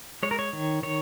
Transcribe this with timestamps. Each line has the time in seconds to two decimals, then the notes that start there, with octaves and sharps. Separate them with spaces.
0.23 G#3 C#5
0.31 A#4
0.39 C#5
0.53 D#3
0.83 D#3 C#5